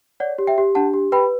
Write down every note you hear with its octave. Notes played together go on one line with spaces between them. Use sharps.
C#5 D5 F#5
G4
E5 G5
G4
D4 F#5 A5
G4
B4 G5 B5